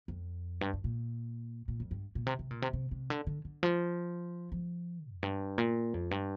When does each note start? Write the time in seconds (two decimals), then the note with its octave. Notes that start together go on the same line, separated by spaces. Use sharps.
0.08 F2
0.61 G2
0.73 G2
0.84 A#2
1.68 A#2
1.80 F2
1.91 G2
2.15 A#2
2.27 C3
2.39 C3
2.51 A#2
2.62 C3
2.73 C3
2.91 C3
3.10 D3
3.27 D3
3.45 D3
3.63 F3
4.52 F3
5.11 F2
5.23 G2
5.58 A#2
5.94 F2
6.11 G2